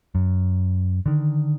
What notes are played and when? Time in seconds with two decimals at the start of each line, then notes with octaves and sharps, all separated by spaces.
0.15 F#2
1.06 D3 D#3